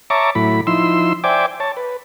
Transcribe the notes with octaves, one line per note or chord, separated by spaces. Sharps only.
C#5 E5 A5 A#5 C#6 D6
A2 F#3 E4 B5
F3 D#4 E4 C6 E6
C5 D5 E5 G5 G#5 D6
C#5 A5
B4